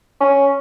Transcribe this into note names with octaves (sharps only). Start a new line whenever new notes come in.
C#4